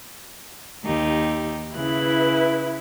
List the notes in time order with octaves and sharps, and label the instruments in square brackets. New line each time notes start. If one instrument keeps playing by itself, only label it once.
[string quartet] D#2 D#4 G4
[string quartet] C#3 F#6 [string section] E4 B4